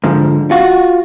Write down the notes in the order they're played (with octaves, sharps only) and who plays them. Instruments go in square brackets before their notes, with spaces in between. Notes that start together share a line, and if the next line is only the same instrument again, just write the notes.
[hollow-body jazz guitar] G#2 D3 F3
F4 F#4